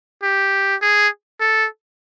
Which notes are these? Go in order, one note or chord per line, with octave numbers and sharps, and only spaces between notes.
G4
G#4
A4